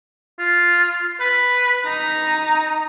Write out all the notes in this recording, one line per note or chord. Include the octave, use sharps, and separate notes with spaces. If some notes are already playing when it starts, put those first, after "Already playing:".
F4
B4
D#4 A#5